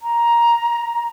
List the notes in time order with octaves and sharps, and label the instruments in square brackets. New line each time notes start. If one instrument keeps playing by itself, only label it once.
[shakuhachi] A#5